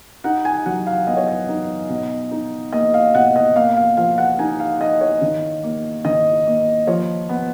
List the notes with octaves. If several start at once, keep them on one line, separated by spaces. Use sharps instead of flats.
D#4 F#5
G#5
F#3 F#5
F5
B3 D#5
C#5
D#5
D#4
B2
D#4
A#3 D#5
F5
B2 F#5
D#5
A#3 F5
F5
F3 F5
F#5
D#4 G#5
F5
D#4 D#5
C#5
D#3
A#3
D#3 D#5
A#3
F3 C#5
B3